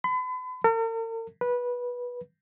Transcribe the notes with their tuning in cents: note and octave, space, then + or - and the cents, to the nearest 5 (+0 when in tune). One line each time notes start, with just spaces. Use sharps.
B5 +40
A#4 -45
B4 -15